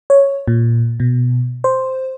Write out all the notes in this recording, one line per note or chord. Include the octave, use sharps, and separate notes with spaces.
C#5
A#2
B2
C5